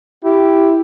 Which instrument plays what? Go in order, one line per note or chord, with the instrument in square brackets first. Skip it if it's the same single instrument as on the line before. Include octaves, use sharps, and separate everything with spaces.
[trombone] E4 [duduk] G4